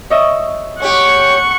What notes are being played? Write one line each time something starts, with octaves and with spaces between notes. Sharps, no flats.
C#5 D#5 E5
C#4 G4 F#5 C#6